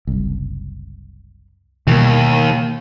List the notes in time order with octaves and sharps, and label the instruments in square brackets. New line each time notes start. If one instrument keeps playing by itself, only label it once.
[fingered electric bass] F#1 C2
[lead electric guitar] D#2 [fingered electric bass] B2 E3 G3